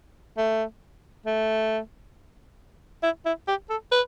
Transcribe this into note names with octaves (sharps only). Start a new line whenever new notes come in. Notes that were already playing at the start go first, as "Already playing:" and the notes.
A3
A3
E4
E4
G4
A4
B4